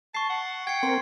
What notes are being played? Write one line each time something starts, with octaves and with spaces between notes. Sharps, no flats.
A5 C#6 C7
F#5
G5 G#6 C7 C#7
C4 A#4 C6